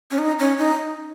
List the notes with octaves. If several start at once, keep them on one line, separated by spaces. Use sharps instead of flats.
C#4
D#4
C#4
D#4